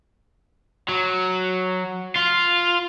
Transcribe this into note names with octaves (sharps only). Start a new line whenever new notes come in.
F#3
F4